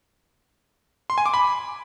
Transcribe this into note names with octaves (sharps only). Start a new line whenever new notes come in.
C6
G#5
D6
B5